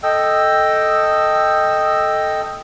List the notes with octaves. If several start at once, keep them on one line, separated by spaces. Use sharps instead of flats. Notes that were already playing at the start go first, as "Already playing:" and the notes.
A4 D#5 G5 E6